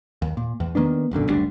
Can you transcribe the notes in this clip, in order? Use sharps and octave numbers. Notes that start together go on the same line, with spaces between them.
D#2
A#2
E2
D#3 A#3 B3 D4
D#1 B1 F#2 D3
F#1 D2 G3 D4